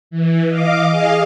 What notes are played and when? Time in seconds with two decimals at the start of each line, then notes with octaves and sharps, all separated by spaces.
0.11 E3
0.48 D#5 F5 D6
0.90 G#4 D#5 F5